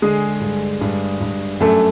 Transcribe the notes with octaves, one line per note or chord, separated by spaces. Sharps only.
D3 G#3 G#4
G2
G2
G2
F#2 A3 A4